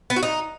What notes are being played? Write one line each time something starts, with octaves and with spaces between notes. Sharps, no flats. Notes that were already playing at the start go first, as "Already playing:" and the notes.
B3
F#4
D#4